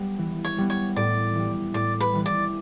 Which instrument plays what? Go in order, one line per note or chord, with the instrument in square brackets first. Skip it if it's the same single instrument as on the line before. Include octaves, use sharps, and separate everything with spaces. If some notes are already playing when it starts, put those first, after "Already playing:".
Already playing: [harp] G3 B3
E3
[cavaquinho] C#5
[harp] G3 B3
[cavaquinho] C#5
[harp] A2 [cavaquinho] D5
[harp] E3 G3
[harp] A2 [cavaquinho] D5
[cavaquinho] B4
[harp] E3 G3
[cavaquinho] D5